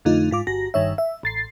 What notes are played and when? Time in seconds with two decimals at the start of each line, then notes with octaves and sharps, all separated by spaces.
0.05 F2 D3 A3 D#4 F4
0.31 G#2 F4 D6
0.47 G1 F#4 A#6
0.74 G1 G2 D#3 C#5 E5
0.98 E5
1.23 A1 A6 C7